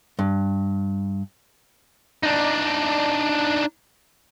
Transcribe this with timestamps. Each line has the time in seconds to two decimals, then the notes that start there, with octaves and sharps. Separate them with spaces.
0.19 G2
2.23 D4 D#4